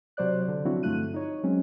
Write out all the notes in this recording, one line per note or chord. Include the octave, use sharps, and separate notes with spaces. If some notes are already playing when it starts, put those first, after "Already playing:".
C3 F#3 C5 D5 F#6
D3
F3 F#3 C4 D4 E4 F#4
G2 D3 A3 F4 F#6 D#7
D#4 C#5
F#3 G#3 C4 C#4